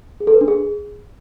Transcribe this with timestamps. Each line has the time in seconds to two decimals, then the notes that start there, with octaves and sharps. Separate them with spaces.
0.20 G#4
0.27 A4
0.34 B4
0.41 D4
0.48 G#4